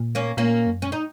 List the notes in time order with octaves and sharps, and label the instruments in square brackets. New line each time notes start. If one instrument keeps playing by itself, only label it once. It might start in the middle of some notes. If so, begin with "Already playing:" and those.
Already playing: [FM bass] A#2
[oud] A#3 C#4
[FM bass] A#2 [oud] A#3 C#4
[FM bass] F#2
[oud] C#4
D#4